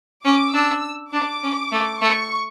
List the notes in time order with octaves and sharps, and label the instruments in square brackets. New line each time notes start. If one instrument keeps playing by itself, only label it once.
[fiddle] C#4 [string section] D6
[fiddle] D4 [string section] E6
[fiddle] D4 [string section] D6
[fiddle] C#4
A3
[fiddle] A3 [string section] C#6